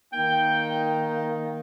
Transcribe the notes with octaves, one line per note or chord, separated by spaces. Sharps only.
D#3 A#3 D#4 G5